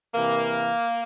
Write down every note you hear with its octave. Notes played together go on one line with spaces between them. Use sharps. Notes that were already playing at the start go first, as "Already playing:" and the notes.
C3 E3 A#3